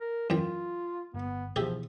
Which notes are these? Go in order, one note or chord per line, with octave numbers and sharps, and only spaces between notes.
A#4
F#2 E3 F4 G5
G1 B3
B2 E3 F3 G4 G#4 E5